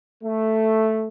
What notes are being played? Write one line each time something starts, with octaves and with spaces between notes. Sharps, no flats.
A3